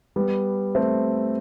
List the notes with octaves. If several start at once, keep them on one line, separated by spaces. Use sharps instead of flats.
G3 B3
A3 C4